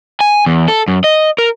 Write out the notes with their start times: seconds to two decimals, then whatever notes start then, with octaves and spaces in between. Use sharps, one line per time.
0.21 G#5
0.46 E2
0.68 A4
0.88 F#2
1.04 D#5
1.38 A#4